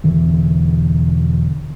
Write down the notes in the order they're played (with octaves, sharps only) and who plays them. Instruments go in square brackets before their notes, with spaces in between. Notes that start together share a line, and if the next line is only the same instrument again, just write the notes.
[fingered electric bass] E1 D3 E3